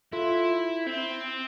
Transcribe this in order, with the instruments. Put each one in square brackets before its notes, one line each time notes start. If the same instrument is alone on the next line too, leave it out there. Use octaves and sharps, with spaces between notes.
[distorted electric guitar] E4 [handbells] F4 A4
[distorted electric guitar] C4